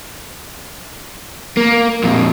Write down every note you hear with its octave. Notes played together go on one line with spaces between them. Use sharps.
A#3
F2 A#2